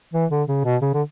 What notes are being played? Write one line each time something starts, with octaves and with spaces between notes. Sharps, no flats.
E3
D3
C#3
B2
C#3
D3